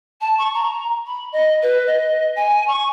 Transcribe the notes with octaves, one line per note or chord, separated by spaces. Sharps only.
A5
C#6
A#5
B5
D#5
B4
D#5
G#5
C#6